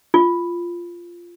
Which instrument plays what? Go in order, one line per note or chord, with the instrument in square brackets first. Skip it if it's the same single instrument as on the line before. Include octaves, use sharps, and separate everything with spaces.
[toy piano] F4